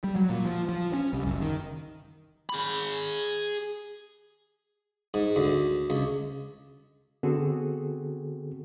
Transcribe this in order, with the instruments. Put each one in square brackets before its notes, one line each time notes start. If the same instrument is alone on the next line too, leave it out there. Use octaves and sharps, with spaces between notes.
[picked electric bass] G3
F#3
A#2
F3
F3
C#4
C2
F#1
D#3
[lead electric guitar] G#4 B5
[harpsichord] G#2
D2
C#2
[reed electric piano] D3 B3 C4 F#4 G#4 A4